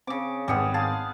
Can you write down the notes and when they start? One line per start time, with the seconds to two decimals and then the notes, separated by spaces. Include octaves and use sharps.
0.07 C#3 C4 D6
0.48 G#1 G3 G#3 B3 C#7
0.74 G#4 F5 A5